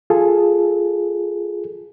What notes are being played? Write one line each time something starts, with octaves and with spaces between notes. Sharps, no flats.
F4 G#4 A4